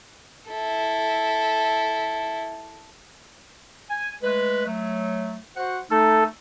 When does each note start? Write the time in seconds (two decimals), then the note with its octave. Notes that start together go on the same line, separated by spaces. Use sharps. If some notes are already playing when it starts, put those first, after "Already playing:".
0.49 E4 A4
3.90 G#5
4.23 G#3 A3 B4
4.66 F#3 A3
5.56 F#4 C5 F#5
5.91 A3 D#4 A4